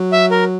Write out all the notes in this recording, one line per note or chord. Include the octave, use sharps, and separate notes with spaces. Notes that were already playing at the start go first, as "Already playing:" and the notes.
Already playing: F#3
E5
A#4